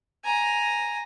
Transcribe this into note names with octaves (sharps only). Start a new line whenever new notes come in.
G#5 A#5